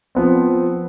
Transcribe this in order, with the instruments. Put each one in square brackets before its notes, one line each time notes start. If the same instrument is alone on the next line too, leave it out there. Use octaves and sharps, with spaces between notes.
[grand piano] F3 B3 C4